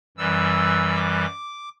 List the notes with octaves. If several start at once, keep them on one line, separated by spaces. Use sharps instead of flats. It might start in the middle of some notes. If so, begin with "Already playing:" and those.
F#2 E3 G3 E6
D6